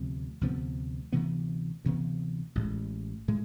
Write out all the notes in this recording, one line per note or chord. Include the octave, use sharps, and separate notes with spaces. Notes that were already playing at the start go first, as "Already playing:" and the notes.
Already playing: D2 C3 F3 B3
D2 C3 F3 B3
D2 C3 E3 B3
D2 C3 E3 B3
A1 A2 G#3
A2 G#3